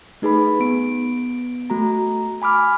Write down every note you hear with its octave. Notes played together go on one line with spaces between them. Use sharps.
A3 D#4 G#4 B4 B5
B3 D7
A3 F#4 A#5
G#5 B5 D6 F6